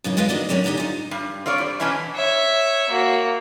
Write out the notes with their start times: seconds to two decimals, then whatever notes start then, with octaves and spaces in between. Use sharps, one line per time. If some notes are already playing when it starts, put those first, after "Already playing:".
0.04 F#2 C#3 E3 D#4
0.17 G#3 F4 B4 D#5 F5
0.29 D2 D#3 D4 F#4 A#4 D#5
0.49 F#3 A3 A#3 C4 C#4
0.64 D3 D4 D#4 G4 G#5
0.78 D#4 F4
1.11 G2
1.46 C4 F4 C#5 D5
1.58 G3
1.80 B2 E3 B3 C#4 D4 E4
2.15 C#5 E5
2.90 A#3 F#4